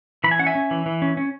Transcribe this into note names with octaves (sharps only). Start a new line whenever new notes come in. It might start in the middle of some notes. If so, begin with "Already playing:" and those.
E3 B5
G#5
C#4 F#5
E5 G#5
C#4
E3
E3
C#4
C#4